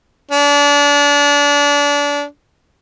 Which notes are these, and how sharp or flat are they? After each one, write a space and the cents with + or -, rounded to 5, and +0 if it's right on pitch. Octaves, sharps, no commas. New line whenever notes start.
D4 -30